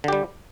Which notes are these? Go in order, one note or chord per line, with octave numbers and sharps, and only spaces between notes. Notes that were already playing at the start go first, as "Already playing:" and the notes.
D3 G3 G4